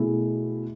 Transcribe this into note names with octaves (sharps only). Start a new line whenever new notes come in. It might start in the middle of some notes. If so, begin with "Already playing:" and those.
Already playing: B2 A3 E4 G#4